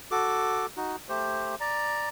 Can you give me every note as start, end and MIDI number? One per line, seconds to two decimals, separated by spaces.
0.11 0.66 66
0.11 0.66 69
0.11 0.66 86
0.77 0.96 63
0.77 0.96 66
1.09 1.55 57
1.09 1.55 67
1.09 1.55 72
1.60 2.09 74
1.60 2.09 82